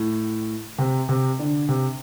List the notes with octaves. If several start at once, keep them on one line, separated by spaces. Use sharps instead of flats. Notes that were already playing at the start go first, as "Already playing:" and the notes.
Already playing: A2
C3
C3
D3
C3